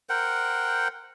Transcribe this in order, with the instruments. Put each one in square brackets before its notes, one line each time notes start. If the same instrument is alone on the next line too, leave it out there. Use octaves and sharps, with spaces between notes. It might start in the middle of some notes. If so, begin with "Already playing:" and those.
[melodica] A#4 C5 F#5 G5